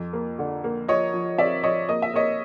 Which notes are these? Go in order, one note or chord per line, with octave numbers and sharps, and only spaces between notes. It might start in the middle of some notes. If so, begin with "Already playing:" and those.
Already playing: F2
A#3
D3
A#3
F3 C#5 D#5
F3
C4 D5 E5
F3 C#5 D#5
A#3 D#5
E5
A#3 C#5 D#5